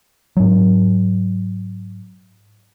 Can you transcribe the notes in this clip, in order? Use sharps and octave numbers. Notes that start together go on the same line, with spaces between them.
G#2 F#3